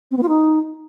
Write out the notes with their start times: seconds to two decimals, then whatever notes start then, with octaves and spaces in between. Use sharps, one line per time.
0.11 C4
0.17 B3
0.23 F4
0.29 D#4